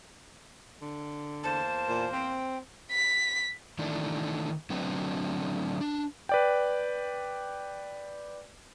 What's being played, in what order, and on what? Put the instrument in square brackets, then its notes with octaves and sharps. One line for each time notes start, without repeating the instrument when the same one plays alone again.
[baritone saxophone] D3
[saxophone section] E2 A#3 C5 [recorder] A5
[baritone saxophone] A#2
[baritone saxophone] C4 [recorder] G5
[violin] B6
[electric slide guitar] D#3 E3 A3 D4 D#4
D3 F#3 A3 C4 D4 B4
D4
[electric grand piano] B4 D5 G5